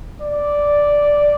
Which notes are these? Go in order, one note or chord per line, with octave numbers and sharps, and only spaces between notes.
D5